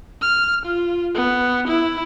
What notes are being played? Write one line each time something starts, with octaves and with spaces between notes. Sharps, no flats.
F6
F4
B3
E4